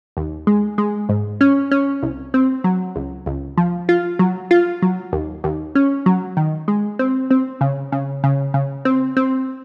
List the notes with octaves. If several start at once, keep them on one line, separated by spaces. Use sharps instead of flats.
D#2
G#3
G#3
G#2
C#4
C#4
C2
C4
F#3
C#2
C#2
F3
F4
F#3
F4
F#3
D#2
D#2
C#4
F#3
D#3
G#3
C4
C4
C#3
C#3
C#3
C#3
C4
C4